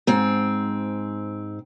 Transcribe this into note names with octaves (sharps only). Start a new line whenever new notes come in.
G#2 C4